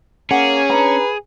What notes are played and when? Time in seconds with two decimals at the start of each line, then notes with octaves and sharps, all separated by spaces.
0.31 A#3 C#4 G#4 F#5
0.70 D4 B4 A#5